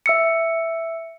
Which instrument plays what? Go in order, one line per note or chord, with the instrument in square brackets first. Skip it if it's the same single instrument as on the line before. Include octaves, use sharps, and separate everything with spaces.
[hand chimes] E5 E6 C#7